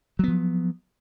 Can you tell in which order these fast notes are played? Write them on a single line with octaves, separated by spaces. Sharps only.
F#3 B3 F3